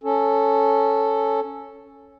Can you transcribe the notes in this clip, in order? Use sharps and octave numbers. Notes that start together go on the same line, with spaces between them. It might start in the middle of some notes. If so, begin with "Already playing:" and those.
C#4 A4